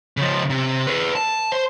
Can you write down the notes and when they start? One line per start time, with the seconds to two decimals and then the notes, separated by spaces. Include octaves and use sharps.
0.17 C#3 F3
0.50 C3
0.87 G#4 B4
1.16 A5
1.52 C5